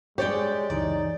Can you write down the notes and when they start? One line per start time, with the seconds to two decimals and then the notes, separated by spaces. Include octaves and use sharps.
0.18 G#3 G4 C#5 D5 G5
0.70 C#2 F#2 E3 D#4 D5